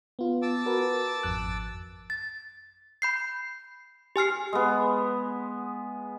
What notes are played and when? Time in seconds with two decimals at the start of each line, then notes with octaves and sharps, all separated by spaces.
0.19 B3 F4
0.42 A5 D6 E6
0.66 F#4 A#4 B4
1.23 G#1 F2 F#6
2.10 A6
3.02 B5 G6 C7
4.16 G4 G#5 F6 C7
4.53 G#3 B3